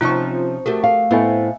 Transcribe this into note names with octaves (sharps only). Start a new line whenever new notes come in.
C3 F3 C#4 D#4 F4 C#6
A3 F#4 G4 A#4
F5
A2 A3 B3 C4 E4 D#5 E5 G#5